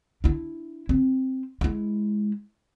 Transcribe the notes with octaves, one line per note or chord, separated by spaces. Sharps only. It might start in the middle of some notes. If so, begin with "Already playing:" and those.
D4 E4
C4
G#3 E4